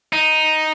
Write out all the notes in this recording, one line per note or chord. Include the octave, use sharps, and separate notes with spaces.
D#4